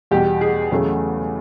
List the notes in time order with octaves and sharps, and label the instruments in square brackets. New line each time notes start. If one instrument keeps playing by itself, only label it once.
[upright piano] E2 B2 G3 G4
G#4
E2 C#3 F#3 A3